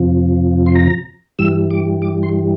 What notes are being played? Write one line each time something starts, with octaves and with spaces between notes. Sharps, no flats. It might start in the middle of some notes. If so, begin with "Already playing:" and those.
Already playing: F2 C3 F3
C6
A#5
G2 E3 G3 E6
D6
D6
C6